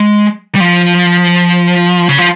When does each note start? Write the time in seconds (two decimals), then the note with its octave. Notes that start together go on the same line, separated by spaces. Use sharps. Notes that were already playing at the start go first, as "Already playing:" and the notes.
Already playing: G#3
0.55 G3
0.60 F3
2.09 C#3
2.18 F3